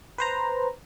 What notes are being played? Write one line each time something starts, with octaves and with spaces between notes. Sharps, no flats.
B4 C5 A#5